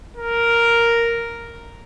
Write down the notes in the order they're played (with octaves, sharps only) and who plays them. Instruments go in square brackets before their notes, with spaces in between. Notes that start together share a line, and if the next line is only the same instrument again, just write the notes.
[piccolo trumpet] A#4